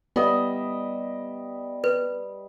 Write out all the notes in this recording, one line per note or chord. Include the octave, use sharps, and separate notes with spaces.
G3 B3 D#5 E5
B4